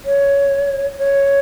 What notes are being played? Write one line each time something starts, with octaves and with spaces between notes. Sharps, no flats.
C#5
C#5